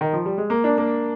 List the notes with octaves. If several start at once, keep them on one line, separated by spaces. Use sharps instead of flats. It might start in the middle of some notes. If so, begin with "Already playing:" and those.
D#3
F3
G3
G#3
A#3
D4
A#3